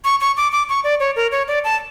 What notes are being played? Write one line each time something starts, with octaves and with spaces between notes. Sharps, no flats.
C#6
C#6
D6
D6
C#6
D5
C#5
A#4
C#5
D5
A5